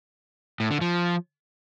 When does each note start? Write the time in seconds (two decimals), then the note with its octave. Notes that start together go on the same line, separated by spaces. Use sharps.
0.60 A2
0.71 D3
0.81 F3